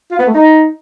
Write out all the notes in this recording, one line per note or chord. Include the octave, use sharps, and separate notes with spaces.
F4
B3
A3
D#4